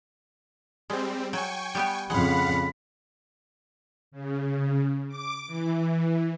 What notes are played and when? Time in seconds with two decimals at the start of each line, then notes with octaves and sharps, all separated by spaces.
0.90 G3 G#3 C4
1.33 F#3 G5 G#5 C#6
1.75 G3 B3 G4
2.10 F2 C#3 G#3 F5 F#5 B5
4.11 C#3
5.08 D6
5.46 E3